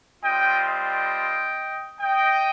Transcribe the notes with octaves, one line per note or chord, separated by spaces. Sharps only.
G3 C4 F4 D#5 G5
D#5 G5
D#5 G5